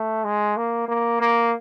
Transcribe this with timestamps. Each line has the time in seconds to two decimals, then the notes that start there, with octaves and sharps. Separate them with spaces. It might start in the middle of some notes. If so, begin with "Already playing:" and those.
Already playing: A3
0.25 G#3
0.57 A#3
0.88 A#3
1.21 A#3